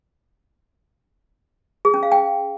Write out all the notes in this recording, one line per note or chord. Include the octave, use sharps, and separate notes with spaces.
G#4
C#4
F5
G5